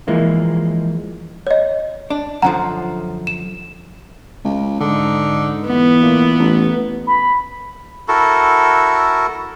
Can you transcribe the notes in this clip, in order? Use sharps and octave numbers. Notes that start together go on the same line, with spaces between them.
E3 F3 G#3 A#3 E4
C#5 D#5
D4
F#2 D3 F3 F#5 A#5
E7
C#2
G#2 D3 D#4
E3 B3
A#2
A1
B5
E4 F#4 A4 A#4